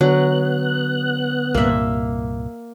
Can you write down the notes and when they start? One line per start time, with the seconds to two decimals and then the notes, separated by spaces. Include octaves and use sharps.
0.01 D3 F#3 B3 F#6
1.54 C2 G2 A#2 A#3 E5